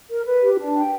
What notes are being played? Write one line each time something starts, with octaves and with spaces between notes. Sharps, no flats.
A#4
B4
G4
D4
G5